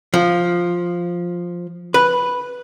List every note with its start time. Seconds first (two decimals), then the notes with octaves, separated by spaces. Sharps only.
0.14 F3
1.94 B4